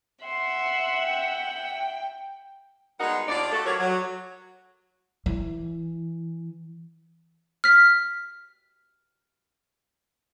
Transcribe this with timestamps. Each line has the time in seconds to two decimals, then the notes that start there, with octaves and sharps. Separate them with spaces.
0.24 E5 F#5 C6
1.03 G5
3.00 G3 G#3 B3 D#4 A#4 F#5
3.28 D#2 D4 F4 D5
3.51 A3 F#4 A4
3.66 F#3 D4 F#4 G4 A#4 C#5
3.79 F#3
5.26 E3
7.64 F6 B6